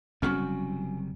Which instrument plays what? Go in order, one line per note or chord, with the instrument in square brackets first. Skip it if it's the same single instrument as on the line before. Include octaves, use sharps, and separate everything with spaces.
[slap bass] F#1 C3 G3 [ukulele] C#4 F4 F#4